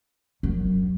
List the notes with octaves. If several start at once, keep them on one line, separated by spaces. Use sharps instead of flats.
F#2